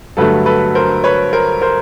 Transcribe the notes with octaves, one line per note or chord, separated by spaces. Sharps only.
G2 D3 F#3 A3 A4 B4
A4 B4
A#4 C5
B4 C#5
A#4 C5
A#4 C5